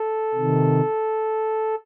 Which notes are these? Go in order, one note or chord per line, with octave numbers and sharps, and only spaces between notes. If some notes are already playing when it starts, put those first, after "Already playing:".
Already playing: A4
C3 D#3